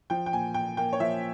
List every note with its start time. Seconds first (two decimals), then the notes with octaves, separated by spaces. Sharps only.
0.10 F3 G5
0.26 G5
0.33 A#2 G#5
0.54 A#2 G5
0.77 A#3 G5
0.93 C#5
1.00 F3 E5